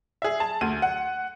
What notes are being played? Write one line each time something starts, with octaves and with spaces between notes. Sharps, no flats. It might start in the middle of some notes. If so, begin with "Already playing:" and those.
G#4 E5
A5
D2 D#7
F#5